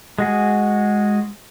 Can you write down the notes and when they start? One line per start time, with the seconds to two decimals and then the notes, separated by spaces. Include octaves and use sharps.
0.18 G#3 F#4 G#4